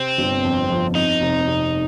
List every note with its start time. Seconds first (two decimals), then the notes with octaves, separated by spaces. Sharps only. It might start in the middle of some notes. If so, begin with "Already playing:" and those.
Already playing: C3 C4
0.18 G1
0.45 F2
0.70 F3
0.95 F2 D#4
1.21 F1
1.47 F1